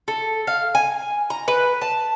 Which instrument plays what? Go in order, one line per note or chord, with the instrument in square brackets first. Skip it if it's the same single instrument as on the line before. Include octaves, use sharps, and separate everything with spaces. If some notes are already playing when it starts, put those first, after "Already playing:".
[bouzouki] A4
F5
G#5
A#5
B4
A5